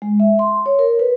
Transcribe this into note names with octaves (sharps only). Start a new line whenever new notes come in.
G#3
E5
C6
C#5
A#4
B4